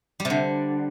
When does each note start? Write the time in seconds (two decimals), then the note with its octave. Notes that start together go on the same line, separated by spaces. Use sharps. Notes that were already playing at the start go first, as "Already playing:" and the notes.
0.20 G3
0.25 C3
0.30 D3